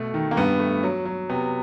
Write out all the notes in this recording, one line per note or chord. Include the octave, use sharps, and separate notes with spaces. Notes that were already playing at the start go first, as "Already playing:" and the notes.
Already playing: B2 A3
D#3
A#3
G2 B3
A3
F#3
F#3
C3 B3